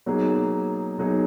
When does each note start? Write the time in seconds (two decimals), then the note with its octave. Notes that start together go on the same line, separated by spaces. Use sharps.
0.06 B2 F#3 A#3 D#4 G#4
0.98 B2 F#3 A#3 D#4 G#4